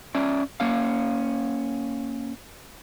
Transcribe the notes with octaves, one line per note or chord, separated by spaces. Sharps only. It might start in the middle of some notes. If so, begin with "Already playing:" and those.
C#4 D5 E5
A#3 C#4 F5